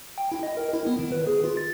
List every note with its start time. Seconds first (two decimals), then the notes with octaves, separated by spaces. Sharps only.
0.18 G5
0.32 E4
0.43 D#5
0.57 A#4
0.73 E4
0.87 B3
0.99 D#3
1.12 B4
1.27 G#4
1.44 F4
1.57 A6